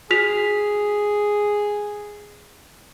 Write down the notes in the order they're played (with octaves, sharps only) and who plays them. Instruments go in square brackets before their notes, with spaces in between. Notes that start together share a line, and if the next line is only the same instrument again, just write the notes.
[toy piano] F#4 [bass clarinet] G#4 [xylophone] F6 B6 F7